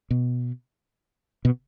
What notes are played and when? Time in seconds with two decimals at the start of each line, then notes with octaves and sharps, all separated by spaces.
0.11 B2
1.45 B2